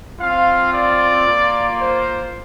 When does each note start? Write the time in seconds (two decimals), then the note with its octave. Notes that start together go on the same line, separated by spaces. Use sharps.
0.20 C4 F4 F5
0.73 D5
1.26 A#3 F4
1.78 C5